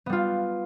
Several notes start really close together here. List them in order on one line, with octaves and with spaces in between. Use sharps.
B3 G3 F4